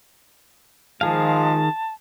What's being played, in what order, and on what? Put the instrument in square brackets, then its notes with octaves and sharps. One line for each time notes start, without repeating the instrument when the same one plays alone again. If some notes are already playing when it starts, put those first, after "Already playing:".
[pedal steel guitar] D#3 G#4 F5 [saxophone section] F3 G#3 [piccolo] A5